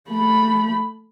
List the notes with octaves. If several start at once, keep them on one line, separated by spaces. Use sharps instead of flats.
A3 B5